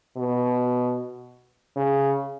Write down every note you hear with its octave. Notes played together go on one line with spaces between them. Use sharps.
B2
C#3